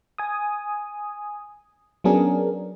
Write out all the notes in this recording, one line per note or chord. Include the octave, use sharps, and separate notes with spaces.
G#5 D#6
F#3 B3 C#4 D4 G#4 A#4